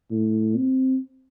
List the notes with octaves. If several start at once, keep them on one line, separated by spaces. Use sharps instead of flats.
A2
C4